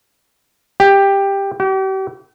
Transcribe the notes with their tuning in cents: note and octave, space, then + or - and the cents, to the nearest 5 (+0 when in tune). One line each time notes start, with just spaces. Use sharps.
G4 +10
G4 -40